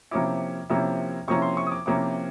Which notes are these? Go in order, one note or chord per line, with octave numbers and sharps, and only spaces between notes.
C3 F3 A#3 C#4 E4 D6
C3 F3 A#3 C#4 E4
C3 F3 A#3 C#4 E4 C#6
C6
C#6
D#6
D6
C3 F3 A#3 C#4 E4 D6